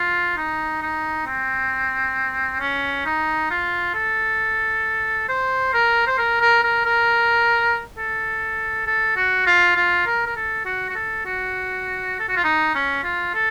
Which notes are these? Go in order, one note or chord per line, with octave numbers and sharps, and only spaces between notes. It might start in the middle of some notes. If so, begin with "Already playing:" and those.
Already playing: F4
D#4
D#4
C4
C#4
D#4
F4
A4
C5
A#4
C5
A#4
A#4
A#4
A#4
A4
A4
F#4
F4
F4
A#4
A#4
A4
F#4
F#4
A4
F#4
A4
F#4
F4
D#4
C#4
F4
A4